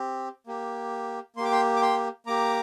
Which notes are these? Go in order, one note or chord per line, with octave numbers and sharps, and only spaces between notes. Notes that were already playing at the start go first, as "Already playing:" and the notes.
Already playing: C4 G4
A#3 G4
A#3 G4 C6 D6
G5 C6
D6
G5 C6
A#3 G4 A#5 D6